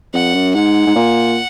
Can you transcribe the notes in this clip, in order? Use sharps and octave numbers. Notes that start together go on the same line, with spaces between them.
F2 F#5
F#2
G#2 F#5
G#2
A#2